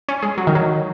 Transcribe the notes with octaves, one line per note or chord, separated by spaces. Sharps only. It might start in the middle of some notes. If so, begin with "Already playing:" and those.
C#4
G#3
F#3
D#3
F#3